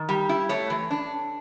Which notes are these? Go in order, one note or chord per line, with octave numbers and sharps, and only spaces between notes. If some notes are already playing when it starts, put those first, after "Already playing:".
Already playing: D#3
G3
E4
A3 C#5
E3
D4